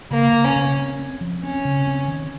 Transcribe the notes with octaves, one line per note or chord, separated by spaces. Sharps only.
C#3 A#3
C#3
C#4
C#3
C4
C4
F3
C4 C#4
C#3
C4
D#3